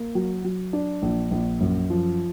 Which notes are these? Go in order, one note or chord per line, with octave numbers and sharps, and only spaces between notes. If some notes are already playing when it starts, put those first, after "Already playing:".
Already playing: A#3
F#3
F#3
D4
A#1
A#1
F#2
F3